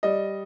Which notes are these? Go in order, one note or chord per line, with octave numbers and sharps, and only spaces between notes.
G3 D#5